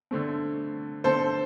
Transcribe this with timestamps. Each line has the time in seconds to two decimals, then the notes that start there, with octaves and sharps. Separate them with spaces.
0.11 D3 A3 C4
1.04 D3 A3 C4 A4 C5